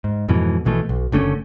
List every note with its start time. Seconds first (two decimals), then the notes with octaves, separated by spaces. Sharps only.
0.04 G#2
0.28 F2 G#2 B2 E3
0.65 A#1 B2 E3 A3
0.89 B1
1.12 F#1 D3 A3 C#4